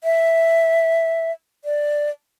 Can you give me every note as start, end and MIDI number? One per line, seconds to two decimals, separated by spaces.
0.04 1.32 76
1.65 2.10 74